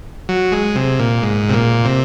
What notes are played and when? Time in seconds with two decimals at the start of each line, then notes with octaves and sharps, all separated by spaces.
0.29 F#3
0.52 G#3
0.75 C3
0.99 A#2
1.22 G#2
1.49 C3
1.54 A#2
1.85 C3